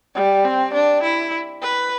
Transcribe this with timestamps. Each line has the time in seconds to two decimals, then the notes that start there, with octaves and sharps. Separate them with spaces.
0.15 G3
0.45 C4
0.74 D4
1.03 E4
1.62 B4